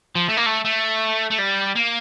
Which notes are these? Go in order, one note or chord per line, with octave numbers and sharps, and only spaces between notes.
F3
A3
A#3
A3
A3
A3
G3
A#3